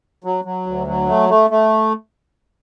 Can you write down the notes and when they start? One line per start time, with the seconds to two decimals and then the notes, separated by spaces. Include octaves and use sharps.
0.24 F#3
0.44 F#3
0.66 D2
0.87 F#3
1.08 A3
1.29 A3
1.50 A3